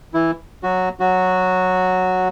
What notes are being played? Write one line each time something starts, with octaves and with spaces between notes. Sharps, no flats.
E3 E4
F#3 F#4
F#3 F#4